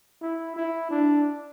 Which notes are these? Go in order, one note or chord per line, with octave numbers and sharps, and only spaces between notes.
E4
E4
D4